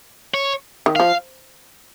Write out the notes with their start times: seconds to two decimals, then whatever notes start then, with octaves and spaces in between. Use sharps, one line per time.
0.34 C#5
0.86 D#3
0.96 F3 F5